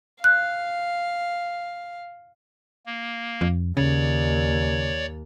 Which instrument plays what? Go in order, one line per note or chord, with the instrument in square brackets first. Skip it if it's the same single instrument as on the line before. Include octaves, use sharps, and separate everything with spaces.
[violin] F5 [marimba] F#6
[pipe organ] A#3
[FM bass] F2
[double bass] D#2 [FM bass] C#3 [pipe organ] C#5 D5